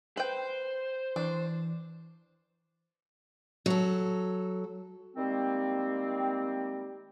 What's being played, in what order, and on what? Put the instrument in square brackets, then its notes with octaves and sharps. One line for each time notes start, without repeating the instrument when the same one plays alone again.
[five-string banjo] B4 G5 [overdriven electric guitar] C5
[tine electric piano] E3 [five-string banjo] D4
[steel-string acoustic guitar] F#3 A4
[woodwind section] D#3 G3 G#3 A#3 C4